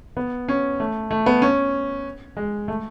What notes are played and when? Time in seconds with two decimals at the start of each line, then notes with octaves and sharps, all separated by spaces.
0.17 B3
0.48 C#4
0.80 A3
1.11 A3
1.26 B3
1.42 C#4
2.37 G#3
2.68 A3